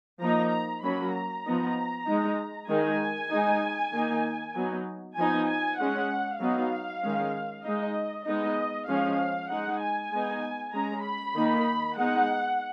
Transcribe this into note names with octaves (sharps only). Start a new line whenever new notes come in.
F3 A#3 D#4 A#5
A#5
F#3 A#3 C#4 B5
A#5
F3 B3 D#4
G#3 D#4
D#3 G#3 D#4 G#5
G#3 D#4
D#3 A#3 D#4
F#3 B3 D#4
F3 B3 D#4 G#5
G#5
G#3 C#4 F#5
F#3 B3 D#4 F5
D#3 G#3 C#4
G#3 D#4 D#5
G#3 B3 D#4 D#5
F3 G#3 C#4 F5
G#3 D#4 F#5
G#5
G#3 B3 D#4
G#3 C#4 A#5
B5
D#3 A#3 D#4
G#3 B3 D#4 F#5